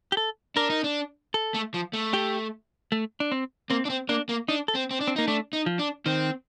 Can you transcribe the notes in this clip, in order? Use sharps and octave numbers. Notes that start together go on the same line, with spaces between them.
G4
A4
D4 A#4
D#4
D4
A4
A3
F3
A3
G4
A3
D4
C4
A#3 C4
D4
C4
A#3 D4
A#3
D4 D#4
A4
C4
C4
D4
C4
A#3 D#4
A3 D4
D#4
F3
D4
D#3 C4